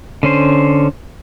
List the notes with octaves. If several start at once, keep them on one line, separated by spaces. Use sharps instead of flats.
D3 C#4 C5